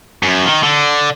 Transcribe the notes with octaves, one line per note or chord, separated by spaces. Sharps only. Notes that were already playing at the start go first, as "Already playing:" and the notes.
F#2
D#3
D3